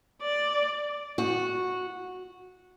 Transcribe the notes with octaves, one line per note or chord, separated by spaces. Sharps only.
D5
F#4